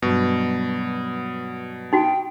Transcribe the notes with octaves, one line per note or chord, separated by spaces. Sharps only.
G2 B2 F#3
D#4 F#4 G5